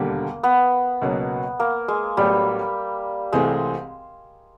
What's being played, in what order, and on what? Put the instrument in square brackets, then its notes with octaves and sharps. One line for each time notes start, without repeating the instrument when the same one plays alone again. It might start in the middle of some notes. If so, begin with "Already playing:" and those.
Already playing: [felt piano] E1 D#2 D3 G3 [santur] A#3
[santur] B3
[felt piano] C#2 B2 F#3 A#3 C#4
[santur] A#3
G#3
[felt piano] A1 A2 F#3 B3 [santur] G3
[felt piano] C2 C3 E3 A3 C4 [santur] G#3